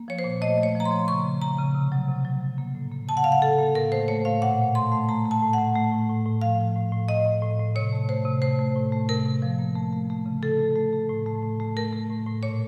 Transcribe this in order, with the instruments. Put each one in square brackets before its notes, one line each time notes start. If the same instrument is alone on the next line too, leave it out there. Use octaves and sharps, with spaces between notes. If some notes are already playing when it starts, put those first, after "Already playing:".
Already playing: [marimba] A#3
F3 C#5
C5
A#2
A3 D#5
A3
C#5
F3 A#5
C6
F3
C#3 C#6
C#3
C#3 A#5
C#3
C3
F#3
C3
F#3
F#3
A#3
A2
A#3
C#3 A5
F#5
C#3 F5
F#5
C#3 A4
A#3
A2 A#4
A3 C5
A3 C#5
A2 F5
A#2 F#5
A3
A3 C6
A3
A3 A#5
A3
A5
A2
F#5
A3
A3
A2
A2
A2
F3 F5
F3
A2
A2
A2 D#5
A2
A2
A2
C3 C#5
A3
A3 C5
C3
A3 C5
A3
A2
A3
C3 A#4
C3
F3
A#3
A3
A3
A3
C#3
A3 A4
A3
A3
A3
A2
A3
A2
A3
A3 A#4
A3
A2
A2
A#2 C#5